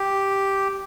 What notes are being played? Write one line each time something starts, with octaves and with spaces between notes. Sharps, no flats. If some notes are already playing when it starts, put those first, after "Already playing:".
Already playing: G4